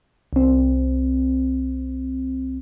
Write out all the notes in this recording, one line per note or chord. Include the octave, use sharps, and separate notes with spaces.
C2 C4